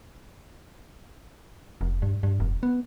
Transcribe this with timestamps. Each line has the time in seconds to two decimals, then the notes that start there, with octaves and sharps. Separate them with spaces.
1.81 F1
2.02 G2
2.23 G2
2.40 F1
2.63 B3